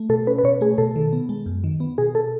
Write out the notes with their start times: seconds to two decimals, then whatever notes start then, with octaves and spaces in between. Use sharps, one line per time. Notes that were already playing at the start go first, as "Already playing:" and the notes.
Already playing: A3
0.09 B2 A4
0.27 C#4 B4
0.38 B4
0.44 B2 C#5
0.61 A3 G#4
0.78 B2 A4
0.96 D#3
1.13 B3
1.29 G#3
1.46 F#2
1.64 D#3
1.80 B3
1.98 B2 G#4
2.15 A4